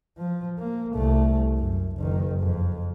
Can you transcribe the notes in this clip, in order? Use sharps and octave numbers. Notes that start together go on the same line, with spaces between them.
F3
A#3
C2 A3
F#2
F#1 D#3
F2